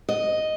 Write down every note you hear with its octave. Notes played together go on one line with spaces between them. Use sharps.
D#5